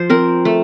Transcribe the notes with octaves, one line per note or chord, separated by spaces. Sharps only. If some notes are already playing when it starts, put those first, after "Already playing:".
Already playing: F3 C5
C4 A#4
A3